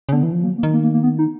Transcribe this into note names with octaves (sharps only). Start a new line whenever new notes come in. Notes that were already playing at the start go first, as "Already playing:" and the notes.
C#3
D3 B3
E3
F3
F#3 A#3
A#3
D#3
A#3
A#3
A#3
B3
D#4